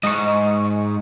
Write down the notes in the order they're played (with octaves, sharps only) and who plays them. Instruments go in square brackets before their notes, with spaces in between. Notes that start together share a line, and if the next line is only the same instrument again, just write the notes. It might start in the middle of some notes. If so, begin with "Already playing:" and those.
[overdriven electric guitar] G#2 [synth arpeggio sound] D#5 C#6